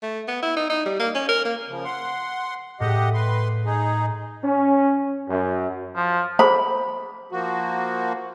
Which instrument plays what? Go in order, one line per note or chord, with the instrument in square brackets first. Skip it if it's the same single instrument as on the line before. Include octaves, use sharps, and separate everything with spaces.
[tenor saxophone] A3
B3
E4
D#4
D#4
G3
A#3
C#4
A#4
A#3
[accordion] C#3 F3
F#5 C6
[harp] A2 [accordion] G4 D#5 F#5
[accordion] B4 C6
D#4 G#4
[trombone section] C#4
F#2
[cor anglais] F3
[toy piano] G#4 A4 C5 [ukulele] B5
[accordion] F3 A#3 F#4